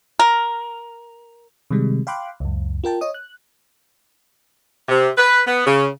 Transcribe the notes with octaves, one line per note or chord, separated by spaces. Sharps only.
A#4
C3 D#3 G3 G#3
F5 G5 B5 C6 D6 F#6
C#2 F#2
F4 A#4 G5 A5
C#5 D#5 D#6
F#6
C3
B4
B3
C#3